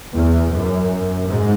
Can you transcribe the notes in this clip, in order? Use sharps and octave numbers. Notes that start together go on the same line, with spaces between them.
E2
F#2
G#2